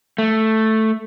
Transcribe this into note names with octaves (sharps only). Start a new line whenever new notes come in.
A3